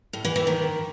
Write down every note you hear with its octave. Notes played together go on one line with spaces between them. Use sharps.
A2
E3
E3
D#3